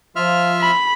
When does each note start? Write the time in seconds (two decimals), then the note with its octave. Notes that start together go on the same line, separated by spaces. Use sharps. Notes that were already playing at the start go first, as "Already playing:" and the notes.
0.16 F3 F4 E5 F6
0.61 B5